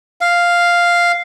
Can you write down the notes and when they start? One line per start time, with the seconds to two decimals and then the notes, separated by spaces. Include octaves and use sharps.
0.21 F5